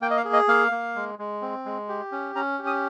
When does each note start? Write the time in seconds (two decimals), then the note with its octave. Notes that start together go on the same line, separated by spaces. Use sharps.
0.01 A#3 G5
0.11 D#5
0.17 F5
0.25 G#4
0.33 D#5
0.48 A#3 F5
0.72 A#3
0.95 G#3
1.19 G#3
1.42 C4
1.65 G#3
1.89 G4
2.12 C#4
2.36 C#4 A#5
2.59 G4
2.67 D#6